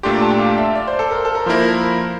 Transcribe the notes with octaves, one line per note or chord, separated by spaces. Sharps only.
A#2 A3 D4 G4 C6
A#5
A5
G5
F5
E5
D5
C5
A4
A#4
A4
A#4
F3 A#3 E4 A#4 C5